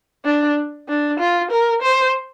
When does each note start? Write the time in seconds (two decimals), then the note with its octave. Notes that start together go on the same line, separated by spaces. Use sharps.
0.25 D4
0.89 D4
1.19 F4
1.51 A#4
1.82 C5